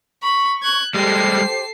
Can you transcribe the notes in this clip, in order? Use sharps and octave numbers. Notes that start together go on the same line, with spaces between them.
B5 C#6
F#6 G#6
G3 G#3 G4 A4 C5 C7